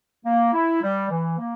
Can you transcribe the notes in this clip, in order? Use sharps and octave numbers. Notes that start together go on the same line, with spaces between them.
A#3
E4
G3
E3
A#3